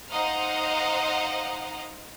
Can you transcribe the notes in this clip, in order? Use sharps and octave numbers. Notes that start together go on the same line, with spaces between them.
D#4 C5 D#5 F5 F#5 A#5